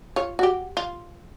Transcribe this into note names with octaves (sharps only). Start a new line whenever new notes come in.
F4 C#5
F#4 G4
F4